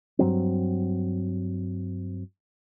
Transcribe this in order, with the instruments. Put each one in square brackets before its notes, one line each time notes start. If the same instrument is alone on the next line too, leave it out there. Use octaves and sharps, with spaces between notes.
[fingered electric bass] G2 F#3 C4